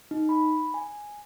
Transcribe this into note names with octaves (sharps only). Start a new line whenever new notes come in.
D#4
B5
G#5